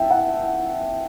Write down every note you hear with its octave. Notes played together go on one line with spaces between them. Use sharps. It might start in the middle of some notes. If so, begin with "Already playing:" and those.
Already playing: E5 G5 A5
F#5